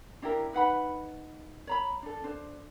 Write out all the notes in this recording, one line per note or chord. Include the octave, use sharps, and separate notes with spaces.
D4 E4 G4 A#4
D#4 B4 F#5 B5
C#5 A#5 B5
D4 A4
D4 C5